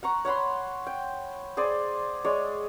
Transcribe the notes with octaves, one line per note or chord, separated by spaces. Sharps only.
F#5 A#5 C#6
C#5 F#5 B5 C6
G5
G#4 C5 D5
G#3 G#4 C#5 D5